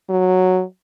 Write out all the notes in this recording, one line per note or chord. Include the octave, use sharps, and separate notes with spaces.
F#3